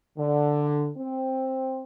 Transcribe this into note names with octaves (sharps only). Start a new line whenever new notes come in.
D3
C4